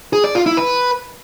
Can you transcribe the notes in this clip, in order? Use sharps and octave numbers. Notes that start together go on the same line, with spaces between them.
G#4
D5
F4
E4
B4